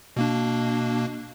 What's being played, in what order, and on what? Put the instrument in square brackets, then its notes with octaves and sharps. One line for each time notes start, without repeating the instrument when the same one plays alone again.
[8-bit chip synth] B2 A#3 D4